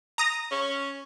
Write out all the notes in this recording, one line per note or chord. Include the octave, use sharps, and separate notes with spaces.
A#5 D#6 A#6
C#4